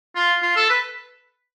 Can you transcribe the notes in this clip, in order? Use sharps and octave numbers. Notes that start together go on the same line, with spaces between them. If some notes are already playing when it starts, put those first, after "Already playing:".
F4
F4
A4
B4